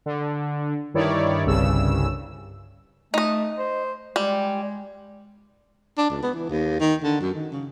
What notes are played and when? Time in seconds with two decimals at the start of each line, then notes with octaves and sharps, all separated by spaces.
0.06 D3
0.94 G2 D#3 E4 C#5 D5
1.45 G1 C2 G2 C#3 E6
3.14 A3 D#4 D#5
3.58 C5
4.16 G3 G#3
5.98 D4
6.10 C#2
6.23 B3
6.34 E3
6.50 D#2
6.80 D#3
7.03 D3
7.21 F#2
7.34 D#3
7.52 C#3